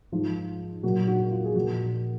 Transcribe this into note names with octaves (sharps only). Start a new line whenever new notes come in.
G#2 F3 F4
A#2 F#3 F#4
F#4
F4
G#4
A#2 F3 F#4